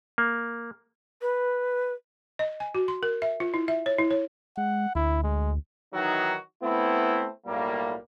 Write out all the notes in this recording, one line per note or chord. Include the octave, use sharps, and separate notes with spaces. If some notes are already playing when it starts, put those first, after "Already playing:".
A#3
B4
D#5
G#5
F#4
C6
A#4
E5
F4
E4
E5
C#5
E4
C#5
G#3 F#5
D2 E4
G#3
D#3 E3 F#3 D#4 F#4
A3 B3 C4 E4
B1 A2 G3 A#3